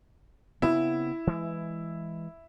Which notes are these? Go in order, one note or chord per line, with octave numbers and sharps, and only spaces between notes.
C#3 B3 C4 E4
E3 G#3